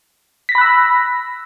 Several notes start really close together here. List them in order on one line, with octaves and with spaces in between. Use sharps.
B6 A#6 B5 F#6 E6